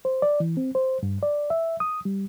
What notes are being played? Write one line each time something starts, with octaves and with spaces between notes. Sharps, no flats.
C5
D5
E3
C4
C5
G2
D5
E5
D#6
G3